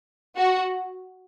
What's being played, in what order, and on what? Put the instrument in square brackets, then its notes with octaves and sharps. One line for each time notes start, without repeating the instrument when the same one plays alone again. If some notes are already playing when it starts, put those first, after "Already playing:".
[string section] F#4